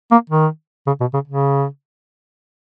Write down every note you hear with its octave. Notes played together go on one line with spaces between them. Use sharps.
A#3
D#3
C#3
B2
C#3
C#3